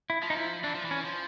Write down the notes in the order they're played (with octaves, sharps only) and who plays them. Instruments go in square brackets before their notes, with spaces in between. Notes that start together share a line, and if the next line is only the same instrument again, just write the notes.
[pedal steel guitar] E4
[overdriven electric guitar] F3
[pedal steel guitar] D#4
E4
[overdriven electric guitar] E3 [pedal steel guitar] D4
[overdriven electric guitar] F3
E3
[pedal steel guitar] C#4
[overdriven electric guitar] F3